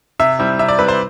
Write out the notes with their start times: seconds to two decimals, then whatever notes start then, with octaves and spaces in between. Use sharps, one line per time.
0.19 C3 E5
0.39 G3 C4 E4
0.59 C3 E5
0.69 D5
0.79 G3 C4 E4 B4
0.88 C5